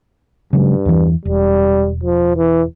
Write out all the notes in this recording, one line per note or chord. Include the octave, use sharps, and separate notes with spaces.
G2 C#3 F#3 G#3
E2 E3
E1 G3
F3
E3